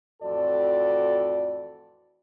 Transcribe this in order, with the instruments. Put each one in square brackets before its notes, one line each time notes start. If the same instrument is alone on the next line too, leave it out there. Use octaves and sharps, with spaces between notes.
[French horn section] F2 A2 E3 F#4 A4 D5